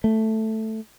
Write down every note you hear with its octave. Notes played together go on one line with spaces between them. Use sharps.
A3